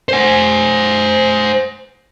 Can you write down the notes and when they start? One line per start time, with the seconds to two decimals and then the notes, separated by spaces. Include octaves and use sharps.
0.09 C5 G#5